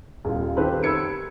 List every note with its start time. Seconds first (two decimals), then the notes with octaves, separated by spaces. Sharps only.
0.25 D#1 F4
0.57 D#3 C4 G4 A4 B4 C5
0.83 B5 E6 G#6 C#7 D7